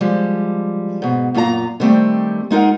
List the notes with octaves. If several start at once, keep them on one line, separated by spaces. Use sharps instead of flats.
F3 G3 G#3
G#2 B2
F#2 A#2 F4 A4 A#5
D3 D#3 G3 A3 C4
G#3 D#4 F4 A#4 F#5